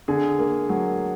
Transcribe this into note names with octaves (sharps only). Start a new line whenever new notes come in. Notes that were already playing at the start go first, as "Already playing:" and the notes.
D3 G#4
A#3
F#3